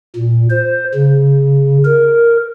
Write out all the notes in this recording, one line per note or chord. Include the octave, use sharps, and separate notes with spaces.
A#2
C5
C#3
A#4